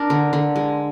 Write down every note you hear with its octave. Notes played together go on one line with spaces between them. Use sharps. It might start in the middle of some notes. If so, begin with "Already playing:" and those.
Already playing: D4 A#4
D3
D3
G#3